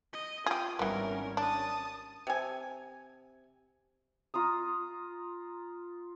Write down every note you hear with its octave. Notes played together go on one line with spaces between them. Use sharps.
D#5
F4 G4 G#4 D#6
G#1 E3 G3 B3 C#4 A#4
D4 A5 D#6
C3 G#5
F4 A#5 D#6